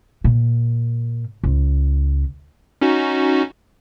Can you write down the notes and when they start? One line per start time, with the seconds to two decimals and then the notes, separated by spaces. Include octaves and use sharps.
0.24 A#2
1.44 C#2
2.81 C#4 D#4 F#4